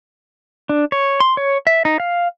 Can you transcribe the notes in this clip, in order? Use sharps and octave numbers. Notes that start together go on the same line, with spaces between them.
D4
C#5
C6
C#5
E5
D#4
F5